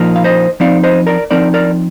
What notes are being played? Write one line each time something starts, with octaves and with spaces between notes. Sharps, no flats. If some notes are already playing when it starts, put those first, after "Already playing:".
Already playing: A#2 F3 A#3 D#4
F5
C5 D#5
F3 C4 D#4 D5 F5
C5 D#5
A#4 D5
F3 C4 D#4 A#4 D5
A#4 D5